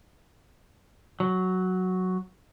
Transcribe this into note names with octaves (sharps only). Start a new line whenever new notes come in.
F#3